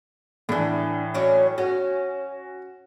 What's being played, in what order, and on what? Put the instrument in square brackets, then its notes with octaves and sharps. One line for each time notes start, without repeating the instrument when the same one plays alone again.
[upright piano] A2 E3 [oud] D4 E4
[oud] F#3 C#4 D5
[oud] C#4 [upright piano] F#4